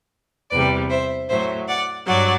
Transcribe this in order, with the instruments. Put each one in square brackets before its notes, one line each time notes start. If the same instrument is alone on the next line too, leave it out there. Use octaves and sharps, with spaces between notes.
[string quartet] E2 C3 G3 B4 D5
C5 E5
A2 F#3 C5 E5
D5 F#5
G2 F#3 D5 F#5